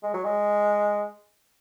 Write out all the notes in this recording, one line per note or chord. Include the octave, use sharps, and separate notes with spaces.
G#3
F#3
G#3